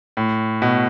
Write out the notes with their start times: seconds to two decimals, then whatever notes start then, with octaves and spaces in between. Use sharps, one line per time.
0.17 A2
0.62 B2